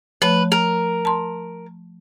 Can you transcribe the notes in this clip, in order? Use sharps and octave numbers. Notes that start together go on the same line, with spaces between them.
F3 A3 B4 C#5
A#4
A5 C6